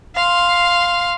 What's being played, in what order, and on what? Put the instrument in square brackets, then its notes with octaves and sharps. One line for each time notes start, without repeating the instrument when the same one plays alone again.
[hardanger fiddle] F5 C6